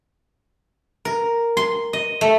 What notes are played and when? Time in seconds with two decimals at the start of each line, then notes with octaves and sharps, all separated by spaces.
1.05 A#4
1.57 C6
1.93 D#5
2.21 A3